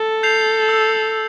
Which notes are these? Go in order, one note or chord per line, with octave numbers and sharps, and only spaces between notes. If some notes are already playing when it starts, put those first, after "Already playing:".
Already playing: A4
G6 C7 F7
E6